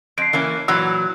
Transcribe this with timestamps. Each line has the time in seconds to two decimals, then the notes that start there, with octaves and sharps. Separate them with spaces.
0.18 F2 C7 D7
0.33 E3 A#3 C#4
0.68 A#2 E3 F#3 E6